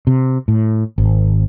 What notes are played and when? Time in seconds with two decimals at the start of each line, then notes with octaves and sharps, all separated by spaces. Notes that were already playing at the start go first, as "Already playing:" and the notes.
0.07 C3
0.48 A2
0.98 G#1